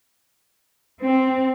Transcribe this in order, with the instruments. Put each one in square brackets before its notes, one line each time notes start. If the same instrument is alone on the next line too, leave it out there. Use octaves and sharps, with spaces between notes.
[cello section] C4